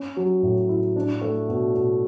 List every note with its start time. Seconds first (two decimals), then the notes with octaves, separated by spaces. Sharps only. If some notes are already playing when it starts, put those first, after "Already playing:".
Already playing: C#4
0.17 F#3
0.42 A2
0.69 E4
0.96 D4
1.21 A3
1.48 B2
1.75 B2